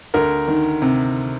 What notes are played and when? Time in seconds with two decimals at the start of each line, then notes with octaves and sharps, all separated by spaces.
0.14 D2 A#4
0.48 D#3
0.82 C3